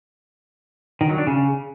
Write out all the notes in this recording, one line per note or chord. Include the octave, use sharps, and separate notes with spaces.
D#3
F#3
D4
C#3